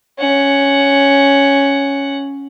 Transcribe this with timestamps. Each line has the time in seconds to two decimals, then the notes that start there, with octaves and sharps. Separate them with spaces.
0.19 C#4 F#5